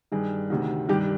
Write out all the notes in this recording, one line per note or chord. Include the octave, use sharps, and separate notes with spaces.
G2 D#3 G#4
D2 C3 D#3
G2 D#3 G4